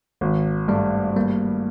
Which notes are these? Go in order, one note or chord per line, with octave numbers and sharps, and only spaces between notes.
G#1
G2 A3
G3 A#3